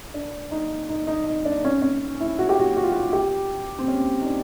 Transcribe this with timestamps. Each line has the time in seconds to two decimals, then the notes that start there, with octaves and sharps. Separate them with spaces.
0.14 D4
0.51 D#4
0.89 D#4
1.07 D#4
1.26 D#4
1.45 D4
1.64 C#4
1.82 C#4
2.20 E4
2.39 F#4
2.49 G4
2.59 F#4
2.77 F#4
2.83 F4
2.91 F#4
3.13 G4
3.79 C4
3.88 C#4
4.21 D#4
4.26 D4